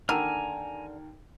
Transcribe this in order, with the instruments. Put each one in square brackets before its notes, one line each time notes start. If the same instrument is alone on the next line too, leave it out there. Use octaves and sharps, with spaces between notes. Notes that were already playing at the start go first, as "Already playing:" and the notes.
[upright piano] D#2 A#4 G5 [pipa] D3 [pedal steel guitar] G#5 A#5 F6